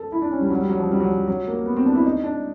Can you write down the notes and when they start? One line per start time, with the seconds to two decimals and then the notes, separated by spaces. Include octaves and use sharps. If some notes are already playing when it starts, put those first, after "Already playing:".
Already playing: A4
0.12 E4
0.22 D4
0.31 C#4
0.41 G3
0.50 F#3
0.60 G3
0.69 F#3
0.79 F3
0.91 G3
1.00 F#3
1.09 F3
1.28 F#3
1.48 A#3
1.66 B3
1.76 C4
1.86 D4
1.95 E4
2.05 D#4
2.24 D4